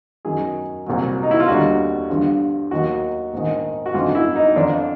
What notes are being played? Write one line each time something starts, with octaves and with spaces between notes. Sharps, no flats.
F#2 D#3 F#3 G#4
C2 A#2 F#3
D#4
E4
F4
D#2 D3 G3 F#4
G2 D3 F3
D#2 D#3 F#3 F#4
A#1 G#2 D#3
F#4
G#1 F#2 D3 F4
E4
D#4
F2 D3 F3 D4